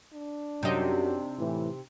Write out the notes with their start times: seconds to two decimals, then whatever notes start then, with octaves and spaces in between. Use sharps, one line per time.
0.13 D4
0.63 F#2 C3 F#3 D#4
1.39 A2 E3